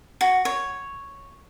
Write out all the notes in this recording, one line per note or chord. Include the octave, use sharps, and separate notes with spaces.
F#4
C#5